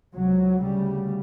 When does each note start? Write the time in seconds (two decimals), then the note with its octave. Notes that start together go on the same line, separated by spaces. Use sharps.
0.14 C#2 C3 F#3
0.61 D2 C#3 G3